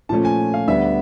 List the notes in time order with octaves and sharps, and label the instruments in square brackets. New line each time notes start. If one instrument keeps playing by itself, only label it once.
[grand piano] A#2 F3 A3 C#4 A5
G#5
F5
D2 D3 G3 B3 E5